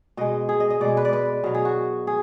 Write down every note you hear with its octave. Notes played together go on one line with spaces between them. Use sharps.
B2 G#3 D#5
G#4
D#5
D#5
B2 G#3 D5
B4
D5
B4
B2 F#3 A#4
G#4
F#4
G#4